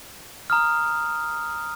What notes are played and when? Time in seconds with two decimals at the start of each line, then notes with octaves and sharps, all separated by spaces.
0.50 A#5 D#6 F6